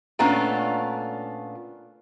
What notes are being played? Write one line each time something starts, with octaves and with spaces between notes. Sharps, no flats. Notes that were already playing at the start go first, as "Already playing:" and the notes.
A#2 A3 B3 C#4 D4 F4